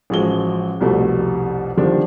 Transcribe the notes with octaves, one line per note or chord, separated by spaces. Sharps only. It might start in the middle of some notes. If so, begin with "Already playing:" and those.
A1 F3 G#3 F#4 G7
C2 F2 B2 G3 A3
D3 D#3 F3 G3 D4